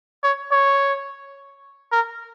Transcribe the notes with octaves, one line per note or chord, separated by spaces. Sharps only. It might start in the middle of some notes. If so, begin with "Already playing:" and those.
C#5
C#5
A#4